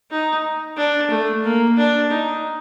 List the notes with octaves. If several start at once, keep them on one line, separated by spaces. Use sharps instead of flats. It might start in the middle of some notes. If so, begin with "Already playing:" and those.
D#4
D4
A3
A#3
D4
D#4